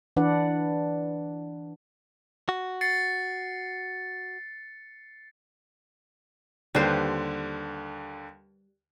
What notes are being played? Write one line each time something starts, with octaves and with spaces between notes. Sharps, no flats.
E3 D4 B4 D5 F#5
F#4
A6 C7 C#7
D#2 D3 G3 B4 C5